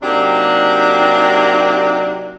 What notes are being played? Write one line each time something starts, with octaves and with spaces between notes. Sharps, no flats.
C3 F#3 A#3 D4 D#4 G4